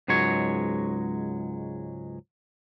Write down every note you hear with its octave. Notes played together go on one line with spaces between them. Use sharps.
C#2 G#2 F#3 G#3 C#5